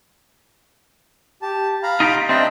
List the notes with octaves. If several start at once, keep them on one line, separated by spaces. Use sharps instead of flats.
G4 A5
F5 A#5 B5
D#4 F4 G4
C4 D4 D#5 E5 G5